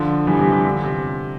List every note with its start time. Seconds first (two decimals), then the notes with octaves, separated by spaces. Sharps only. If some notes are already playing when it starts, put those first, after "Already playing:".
Already playing: D3 F3
0.27 E3 G3
0.39 C3 E3
0.52 C3
0.65 D3
0.84 C3